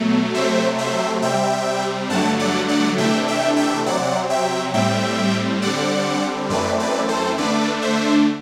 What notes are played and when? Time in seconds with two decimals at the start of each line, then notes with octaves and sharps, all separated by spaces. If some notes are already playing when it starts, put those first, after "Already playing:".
Already playing: B2 F#3 A3
0.34 C3 F#3 A3 C4 C5 E5
0.78 C5 E5
1.22 C3 G3 C4 E5 G5
2.10 G2 D3 F#3 A3 F#5 A5
2.39 D5 F#5
2.68 D5 F#5
2.98 C3 E3 A3 D4 E5 G5
3.28 E5 G5
3.56 E5 G5
3.86 C3 F#3 C4 D5 F#5
4.30 E5 G5
4.74 A2 G3 C4 E5 G5
5.62 D3 G3 C4 D5 F#5
6.50 F#2 E3 A3 C4 B4 D5
6.80 B4 D5
7.09 A4 C5
7.38 D3 A3 D4 B4 D5
7.82 C5 E5